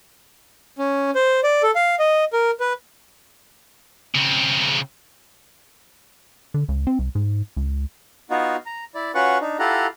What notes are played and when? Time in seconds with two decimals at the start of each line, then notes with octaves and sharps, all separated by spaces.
0.78 C#4
1.15 C5
1.44 D5
1.63 A4
1.75 F5
1.99 D#5
2.33 A#4
2.60 B4
4.15 C#3 C4
6.54 D3
6.69 C#2
6.87 C4
6.99 C2
7.15 G#2
7.57 C#2
8.30 B3 D#4 F4 F#4
8.66 A#5
8.95 E4 D5
9.15 C#4 F4 F#4 B4 F#5 C#6
9.41 D4 D#4
9.59 E4 F4 G4 A4 F#5 A#5